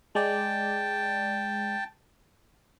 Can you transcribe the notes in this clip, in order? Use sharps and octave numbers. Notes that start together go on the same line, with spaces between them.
G#3 D5 G5 A5